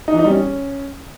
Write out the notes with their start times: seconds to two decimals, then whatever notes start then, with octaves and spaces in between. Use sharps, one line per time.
0.08 D#4
0.13 E3
0.19 D#4
0.25 G3
0.31 C#4